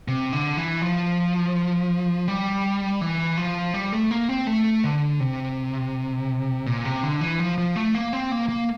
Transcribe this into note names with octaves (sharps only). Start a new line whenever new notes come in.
C3
D3
E3
F3
G3
E3
F3
G3
A3
A#3
C4
A3
D3
C3
A#2
C3
D3
E3
F3
F3
A3
A#3
C4
A#3
A#3